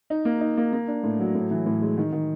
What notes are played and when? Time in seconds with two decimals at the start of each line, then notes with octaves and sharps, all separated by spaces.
0.10 D#4
0.25 A#3
0.41 D#4
0.57 A#3
0.73 A#3
0.88 D4
1.03 A2
1.20 F#3
1.35 A2
1.51 E3
1.66 A2
1.82 G#3
1.98 D#3
2.12 D#3